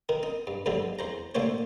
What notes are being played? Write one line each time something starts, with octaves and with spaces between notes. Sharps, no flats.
D#3 A#4
D#4
G2
G2 D3 F3 F#3 G#3
E2 C5 A#5
A1 D3 A3 A#3 C5 C#5